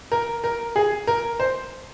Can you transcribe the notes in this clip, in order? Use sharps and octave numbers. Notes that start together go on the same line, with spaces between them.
A#4
A#4
G#4
A#4
C5